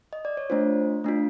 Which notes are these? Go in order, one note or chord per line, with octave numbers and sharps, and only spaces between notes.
D#5
D5
C#5
A3 D4 F4 C5
A3 D4 F4